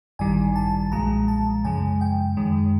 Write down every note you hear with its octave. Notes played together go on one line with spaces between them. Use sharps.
A1 G2 D#3 G3 G#5
A5
B1 A#2 F3 G#3 A#5
A5
F#2 C#3 F3 G#3 G#5
G5
F#2 D#3 G#3